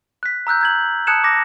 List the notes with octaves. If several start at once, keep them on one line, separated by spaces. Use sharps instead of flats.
F#6 B6
A#5 E6 F#6 G6
G6 G#6 F#7
A5 D#6 F#6 G#6 C#7 E7
D6 A#6